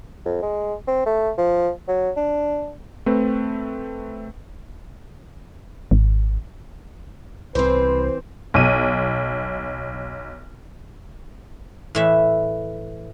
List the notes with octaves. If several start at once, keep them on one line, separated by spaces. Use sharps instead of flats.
F2
G#3
C4
A3
F3
F#3
D4
A3 C4 B4
G#1
C2 E3 C4 B4 C5
B1 D#7
A2 E3 E5